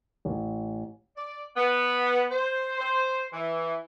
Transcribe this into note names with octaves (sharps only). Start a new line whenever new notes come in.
A1
D5
B3
C5
C5
E3